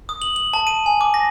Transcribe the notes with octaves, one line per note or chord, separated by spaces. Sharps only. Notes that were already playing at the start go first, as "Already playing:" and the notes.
D#6
F#7
F#7
A5
D#7
G#5
D6
A#6